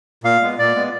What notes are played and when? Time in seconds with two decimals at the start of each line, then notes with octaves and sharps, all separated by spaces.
0.24 A#2 F5
0.42 G#3 B3
0.59 A#2 D5
0.75 G#3 B3